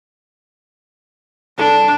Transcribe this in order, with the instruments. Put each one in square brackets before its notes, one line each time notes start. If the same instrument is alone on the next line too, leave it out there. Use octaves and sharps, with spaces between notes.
[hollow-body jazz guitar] C2 G2 A4 [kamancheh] D4